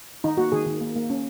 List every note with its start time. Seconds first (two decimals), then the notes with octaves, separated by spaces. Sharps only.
0.24 D#3 D#4
0.37 A#3 F#4
0.52 D#3 G#4
0.66 D#3
0.81 A#3
0.96 A#3
1.10 C#4